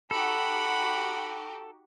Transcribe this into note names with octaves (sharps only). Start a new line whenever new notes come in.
D#4 F#4 G4 A4 F#5 B5